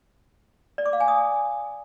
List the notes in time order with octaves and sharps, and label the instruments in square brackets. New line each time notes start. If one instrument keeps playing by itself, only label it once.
[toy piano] D5
D6
F5
G#5
D#6